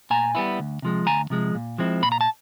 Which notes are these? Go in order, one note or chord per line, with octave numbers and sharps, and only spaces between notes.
A#2 G#5 A#5
G3 B3 E4
D2
C3 F3 G#3
D2 G#5 A#5
C3 F3 G#3
A#2
F3 G#3 C4 E4
A#2 B5
A#5
A5